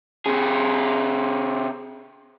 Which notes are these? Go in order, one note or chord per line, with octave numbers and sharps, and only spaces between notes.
C3 G#4